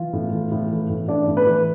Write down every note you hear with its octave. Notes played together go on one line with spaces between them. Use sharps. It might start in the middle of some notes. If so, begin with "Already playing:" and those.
Already playing: E3 F4
A2
E3
A2
E3
A2
E3 D4 D5
A2
B4
E3